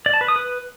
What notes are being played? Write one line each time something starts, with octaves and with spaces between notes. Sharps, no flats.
D5
A5
B4
D#6
B4